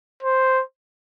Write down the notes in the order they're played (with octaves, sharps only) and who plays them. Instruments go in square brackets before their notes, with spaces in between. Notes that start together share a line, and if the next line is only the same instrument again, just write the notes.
[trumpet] C5